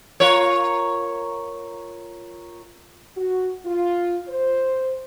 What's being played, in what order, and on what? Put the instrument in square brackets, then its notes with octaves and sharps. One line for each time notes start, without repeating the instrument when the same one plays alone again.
[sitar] F4 A#4 C#5
[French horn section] F#4
F4
C5